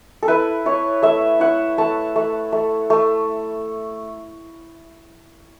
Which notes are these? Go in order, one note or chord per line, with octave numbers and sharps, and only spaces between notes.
A4
E4 B4
E4 C#5
A3 E5
E4 F#5
A3 A5
A3
A3
A3